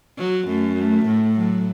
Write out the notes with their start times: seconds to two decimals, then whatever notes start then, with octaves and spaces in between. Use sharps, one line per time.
0.18 F#3
0.47 F#2 A3
0.76 A3
1.05 A2
1.35 F#3